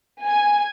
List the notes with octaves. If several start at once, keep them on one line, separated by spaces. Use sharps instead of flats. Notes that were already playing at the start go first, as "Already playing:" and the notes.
G#5